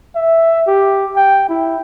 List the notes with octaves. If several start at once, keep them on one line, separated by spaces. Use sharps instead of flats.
E5
G4
G5
E4